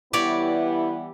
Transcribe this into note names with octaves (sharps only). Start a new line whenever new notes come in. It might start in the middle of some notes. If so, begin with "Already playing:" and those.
E3 G3 B3 E4 G4 C#5 D5